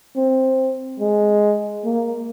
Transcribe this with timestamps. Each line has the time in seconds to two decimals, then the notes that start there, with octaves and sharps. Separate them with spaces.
0.16 C4
1.00 G#3
1.85 A#3